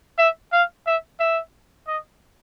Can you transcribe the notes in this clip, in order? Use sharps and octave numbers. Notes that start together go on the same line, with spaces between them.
E5
F5
E5
E5
D#5